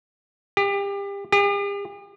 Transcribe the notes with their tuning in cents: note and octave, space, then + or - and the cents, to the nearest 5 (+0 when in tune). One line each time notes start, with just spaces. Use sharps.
G4 +30
G4 +45